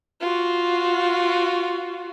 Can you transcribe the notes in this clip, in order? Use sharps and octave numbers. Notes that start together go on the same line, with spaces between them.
F4 F#4